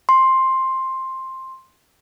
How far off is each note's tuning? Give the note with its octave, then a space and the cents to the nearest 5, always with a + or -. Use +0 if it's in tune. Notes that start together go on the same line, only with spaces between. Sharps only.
C6 +10